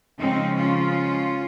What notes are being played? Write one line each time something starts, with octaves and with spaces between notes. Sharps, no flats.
C#3 F3 G#3 C4 D#4
C#4 F4